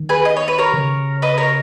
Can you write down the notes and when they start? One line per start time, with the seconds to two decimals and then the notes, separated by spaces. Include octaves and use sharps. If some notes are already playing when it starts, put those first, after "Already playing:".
Already playing: D#3
0.09 G#4 B4
0.25 D#5
0.37 C#5
0.48 B4
0.58 A#4 C#5
0.74 C#3
1.22 B4 D#5
1.38 A#4 C#5